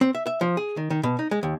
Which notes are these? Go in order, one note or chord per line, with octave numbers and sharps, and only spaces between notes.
C4
E5
E5
F3
G#4
D#3
D#3
B2
D#4
G#3
D#2